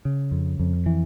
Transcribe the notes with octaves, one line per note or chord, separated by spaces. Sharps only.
C#3
F2
F2
E3